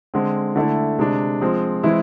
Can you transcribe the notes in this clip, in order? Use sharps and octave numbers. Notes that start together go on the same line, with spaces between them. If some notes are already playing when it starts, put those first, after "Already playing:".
D3 G#3 C4
D3 A3 E4
C3 G#3 D4
F3 G#3 C4
E3 G#3 C4 E4